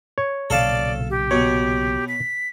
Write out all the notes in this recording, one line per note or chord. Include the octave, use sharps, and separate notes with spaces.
C#5
B1 A#2 C#3 A4 D5 F5 A5
G4
B2 C#5
B6